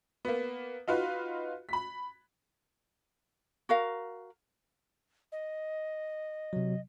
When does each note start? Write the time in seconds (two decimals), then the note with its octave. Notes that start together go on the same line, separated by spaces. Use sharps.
0.25 A#3 B3
0.88 D#4 F4 F#4 B4
1.69 B5 B6
3.69 F#4 A#4 F5
5.32 D#5
6.53 C3 F#3